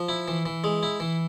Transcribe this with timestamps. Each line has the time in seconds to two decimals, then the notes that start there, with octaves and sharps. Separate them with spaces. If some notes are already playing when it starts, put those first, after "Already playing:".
Already playing: F3
0.09 E4
0.28 E3
0.46 E3
0.64 G#3
0.83 E4
1.00 E3